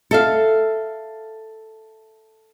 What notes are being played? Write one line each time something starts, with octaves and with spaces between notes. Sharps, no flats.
A4 E5 F5